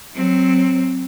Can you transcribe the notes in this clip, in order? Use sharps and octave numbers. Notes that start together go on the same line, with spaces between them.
F#3 C4